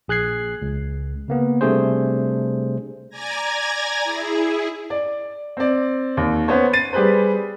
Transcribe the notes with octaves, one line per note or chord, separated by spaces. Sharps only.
A#1 G#4 F#6 G#6 C7
C#2
C#3 A#3 B3
C3 G3 A3 D4 G#4 C5
D5 G#5 A#5 G#6 A#6
E4 G#4
D5
C4 D5
D#2
B3 C#4 C5 C#5
A6 C7 D#7
G3 G4 G#4 B4 C5